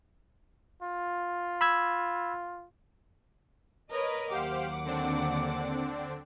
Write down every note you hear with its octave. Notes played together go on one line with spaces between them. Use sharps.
F4
B5 E6 G#6
A#4 B4 C#5 D#5
D#2 F#3 G4 C5 F5 F#5 D6
D3 C4 D4